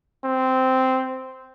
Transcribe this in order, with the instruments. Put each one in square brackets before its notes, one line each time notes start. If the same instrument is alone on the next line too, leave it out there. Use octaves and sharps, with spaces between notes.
[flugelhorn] C4